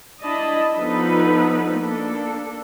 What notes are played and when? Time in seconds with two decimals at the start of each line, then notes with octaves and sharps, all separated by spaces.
0.22 D4 E4 D#5 A5 B5
0.78 F3 B3 D4 D#4 A4 B4
1.76 A#3 D4 A4